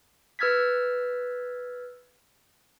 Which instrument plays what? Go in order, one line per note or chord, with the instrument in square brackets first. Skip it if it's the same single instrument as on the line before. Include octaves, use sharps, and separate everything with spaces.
[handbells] B4 E6 F6 G#6 A6 B6